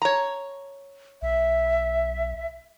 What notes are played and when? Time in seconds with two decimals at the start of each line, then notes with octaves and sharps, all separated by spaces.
0.02 C#5 A#5
1.22 B1 E5